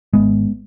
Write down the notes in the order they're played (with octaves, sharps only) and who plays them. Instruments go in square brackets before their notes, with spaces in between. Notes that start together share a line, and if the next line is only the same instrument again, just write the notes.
[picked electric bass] G#1 G#3 B3